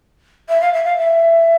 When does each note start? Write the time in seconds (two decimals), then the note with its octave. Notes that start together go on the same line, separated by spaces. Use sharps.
0.48 E5
0.61 F5
0.73 E5
0.84 F5
0.97 E5